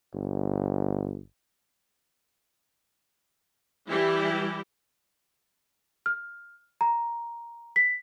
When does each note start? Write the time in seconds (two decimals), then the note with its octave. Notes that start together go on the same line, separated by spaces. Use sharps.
0.14 G1
3.88 E3 G3 E4 G4
6.06 F6
6.81 A#5
7.76 B6